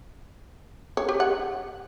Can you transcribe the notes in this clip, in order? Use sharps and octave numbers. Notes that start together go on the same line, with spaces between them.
C#5
G4
F#5